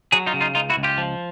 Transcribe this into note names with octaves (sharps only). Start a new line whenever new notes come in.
F#3 F#4 G#4
D#4 F4
C#3
D#4 F4
C#2 D#4 F4
E4 F#4
C#2
F4 G4
F3